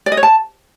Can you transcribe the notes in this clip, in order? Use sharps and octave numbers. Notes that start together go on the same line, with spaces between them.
D5
D#5
C#5
A5